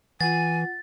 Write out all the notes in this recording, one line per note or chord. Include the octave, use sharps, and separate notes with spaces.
E3 F4 F#5 G#5 A6